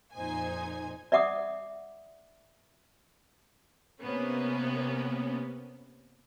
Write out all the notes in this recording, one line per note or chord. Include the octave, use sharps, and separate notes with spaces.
F2 A#2 D#4 C5 G#5 G#6
D5 E5 F#5 D6 D#6
C3 A#3 B3 C#4